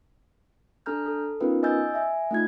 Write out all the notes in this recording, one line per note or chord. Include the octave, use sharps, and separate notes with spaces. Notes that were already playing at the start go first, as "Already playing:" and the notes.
D4 A4 A#5 F6 G6
A4
B3 C#4 D#4 F4 A#4 B4
D#5 G#5 E6 G6 A6
E5 G#5
A3 D#4 F4 G#6